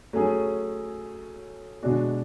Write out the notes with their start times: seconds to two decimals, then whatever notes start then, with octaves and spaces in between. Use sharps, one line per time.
0.13 F#3 A3 C#4 G#4
1.83 B2 G#3 D4 F#4